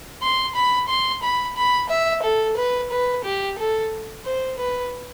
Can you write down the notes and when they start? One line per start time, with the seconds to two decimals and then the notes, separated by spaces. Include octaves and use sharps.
0.22 C6
0.55 B5
0.88 C6
1.22 B5
1.56 B5
1.89 E5
2.23 A4
2.56 B4
2.91 B4
3.24 G4
3.58 A4
4.25 C5
4.58 B4